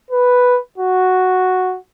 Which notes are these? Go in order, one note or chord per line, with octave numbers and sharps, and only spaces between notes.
B4
F#4